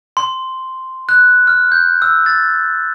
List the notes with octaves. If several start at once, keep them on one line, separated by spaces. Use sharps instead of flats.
C6
F#6
F6
G6
E6
A6